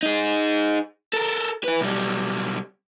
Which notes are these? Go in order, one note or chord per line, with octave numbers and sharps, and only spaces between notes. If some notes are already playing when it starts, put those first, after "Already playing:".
D#4 G#4
A4 A#4
E4 B4
B1 G3